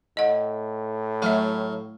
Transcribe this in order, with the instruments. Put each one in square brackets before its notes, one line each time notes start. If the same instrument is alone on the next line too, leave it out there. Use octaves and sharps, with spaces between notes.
[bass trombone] A2 [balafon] D#5 F#5
[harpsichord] F#3 F5 [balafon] A3 E5